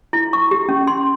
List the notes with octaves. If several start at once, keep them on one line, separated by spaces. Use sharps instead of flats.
E4
C#6
G4
C#4
C6